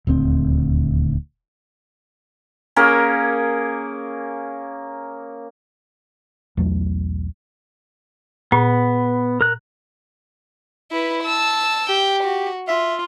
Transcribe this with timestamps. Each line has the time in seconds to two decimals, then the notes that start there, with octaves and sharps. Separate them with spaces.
0.07 D#1 D2 C4
2.76 A#3 C#4 G#4 A#4
6.57 B1 E2 F#3 A3
8.52 A#2 B3
9.41 A#4 F#6
10.91 E4 B4
11.23 A5 E6
11.89 G4 G5
12.23 F#4
12.68 F4 E5